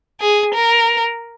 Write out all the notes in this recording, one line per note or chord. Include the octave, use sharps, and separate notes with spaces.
G#4
A#4